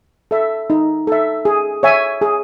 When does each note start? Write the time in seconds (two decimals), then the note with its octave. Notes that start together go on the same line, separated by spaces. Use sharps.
0.31 A4 E5
0.70 D#4
1.07 A4 E5
1.45 G#4
1.83 C#5 E5 G#5
2.22 G#4